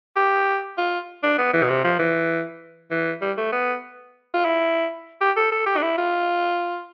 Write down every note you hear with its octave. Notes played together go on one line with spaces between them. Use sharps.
G4
F4
D4
B3
E3
B2
C3
F3
E3
E3
G3
A3
B3
F4
E4
G4
A4
A4
G4
D4
E4
F4